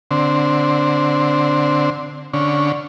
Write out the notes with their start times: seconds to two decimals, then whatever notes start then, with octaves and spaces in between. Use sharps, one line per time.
0.11 D3 C4
2.33 D3 C#4